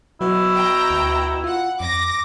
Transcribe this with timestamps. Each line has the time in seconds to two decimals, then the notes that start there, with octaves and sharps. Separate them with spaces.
0.21 B2 F#3 E4
0.57 G5 A#5
0.90 D2
1.44 F4 F#5
1.80 F2 D6 A#6